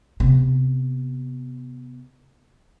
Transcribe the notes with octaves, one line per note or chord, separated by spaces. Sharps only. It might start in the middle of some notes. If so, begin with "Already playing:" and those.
C3 B3